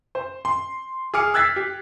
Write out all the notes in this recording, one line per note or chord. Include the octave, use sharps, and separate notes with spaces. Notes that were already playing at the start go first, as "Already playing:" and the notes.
C5
C6
G#4 D6 F6 C#7
E6 F#6 G#6 A6 B6 C7
G4